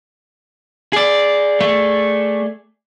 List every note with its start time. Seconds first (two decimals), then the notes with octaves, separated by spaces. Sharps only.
0.93 G#4 D5
1.61 A3